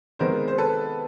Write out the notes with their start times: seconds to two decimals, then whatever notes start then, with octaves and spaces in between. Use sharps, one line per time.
0.19 C3 D#3 G#3 B3 A#4 C5
0.48 C5
0.58 A4 B4